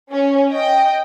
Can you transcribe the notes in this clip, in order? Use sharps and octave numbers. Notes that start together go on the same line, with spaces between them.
C#4
D#5 G5